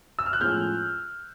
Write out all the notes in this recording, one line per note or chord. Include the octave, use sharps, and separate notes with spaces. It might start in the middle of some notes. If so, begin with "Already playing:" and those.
E6
F6
F#6
A2 F3 G#3 C#4 F6 G6